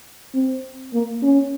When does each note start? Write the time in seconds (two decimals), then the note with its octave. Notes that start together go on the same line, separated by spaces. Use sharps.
0.34 C4
0.93 A#3
1.22 C#4